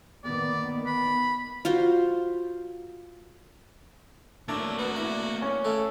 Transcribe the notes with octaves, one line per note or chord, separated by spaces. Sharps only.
D#3 A#3 B3 D5
B5
F4 F#4 C5
F#3 A3 A#3 D4 E5
B3 F#4
E4 D5
C#4
C#3 A3 A4